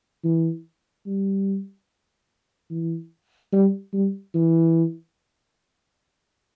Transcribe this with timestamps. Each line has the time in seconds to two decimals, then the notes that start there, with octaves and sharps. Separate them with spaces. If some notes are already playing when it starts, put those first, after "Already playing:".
0.24 E3
1.06 G3
2.70 E3
3.53 G3
3.93 G3
4.34 E3